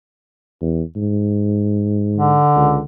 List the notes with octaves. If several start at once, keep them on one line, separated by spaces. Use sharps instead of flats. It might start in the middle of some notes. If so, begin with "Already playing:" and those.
E2
G#2
D3
C#2